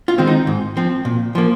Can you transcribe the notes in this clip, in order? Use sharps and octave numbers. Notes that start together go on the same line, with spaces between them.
F4
D#3 G#3 C4
D#4
G#2
F3 C4
A#2
F3 A#3